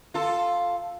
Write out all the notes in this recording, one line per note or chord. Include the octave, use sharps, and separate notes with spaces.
F4 A4